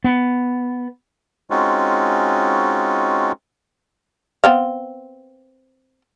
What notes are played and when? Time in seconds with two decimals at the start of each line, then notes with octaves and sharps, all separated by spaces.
0.04 B3
1.50 G#3 C4 C#4 D#4 F4 F#4
4.44 B3 C4 F5